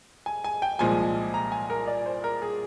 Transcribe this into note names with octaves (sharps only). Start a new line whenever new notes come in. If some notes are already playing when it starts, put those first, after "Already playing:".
G#5
G#5
G5
C2 A#2 F3 G#3 G#5
A#5
G#5
A#4
D5
C5
A#4
G#4